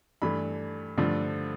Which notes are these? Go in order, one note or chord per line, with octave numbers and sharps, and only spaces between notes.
G2 E3 A3 B5
G2 D3 F3 A3